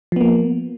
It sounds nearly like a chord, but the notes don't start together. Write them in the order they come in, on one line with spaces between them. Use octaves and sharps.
F3 B3 A#3